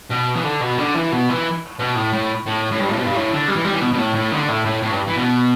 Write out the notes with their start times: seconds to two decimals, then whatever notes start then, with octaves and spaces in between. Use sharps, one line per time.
0.11 B2
0.36 E3
0.44 D3
0.62 B2
0.78 D3
0.95 E3
1.12 B2
1.29 E3
1.79 B2
1.96 A2
2.13 A2
2.47 A2
2.72 A2
2.80 G2
2.89 A2
2.97 B2
3.06 G2
3.14 A2
3.31 D3
3.48 G3
3.56 E3
3.65 G3
3.72 E3
3.81 B2
3.93 B2
3.98 A2
4.15 A2
4.32 D3
4.49 A2
4.65 A2
4.83 A2
4.91 G2
5.07 E3
5.16 B2